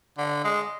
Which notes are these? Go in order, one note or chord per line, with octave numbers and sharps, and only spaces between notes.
D3
G#3